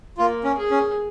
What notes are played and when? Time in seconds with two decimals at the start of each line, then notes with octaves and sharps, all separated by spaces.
0.18 A#3 F4
0.44 C#4
0.57 G#4
0.71 C#4